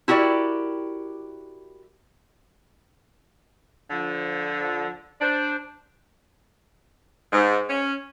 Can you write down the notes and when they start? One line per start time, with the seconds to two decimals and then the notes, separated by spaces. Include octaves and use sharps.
0.08 E4 F#4 G4 A#4 D5
3.91 D3 F3
5.21 D4 C5
7.32 G#2
7.69 C#4